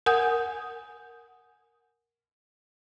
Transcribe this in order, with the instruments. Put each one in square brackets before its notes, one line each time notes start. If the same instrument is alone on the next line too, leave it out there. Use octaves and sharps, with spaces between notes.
[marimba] A#4 F#5 G#5 D#6 G6